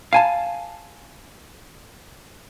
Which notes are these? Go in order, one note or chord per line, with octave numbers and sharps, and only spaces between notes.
F5 G#5 A5